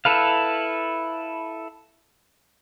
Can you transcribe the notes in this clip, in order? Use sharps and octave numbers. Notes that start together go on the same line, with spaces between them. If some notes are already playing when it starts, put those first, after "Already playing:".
E4 A4 B4 F5